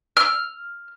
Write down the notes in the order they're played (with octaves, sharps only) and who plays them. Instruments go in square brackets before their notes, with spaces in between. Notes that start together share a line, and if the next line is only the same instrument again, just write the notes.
[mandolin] F6